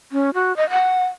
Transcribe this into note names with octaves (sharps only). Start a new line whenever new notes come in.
C#4
F#4
D#5
F#5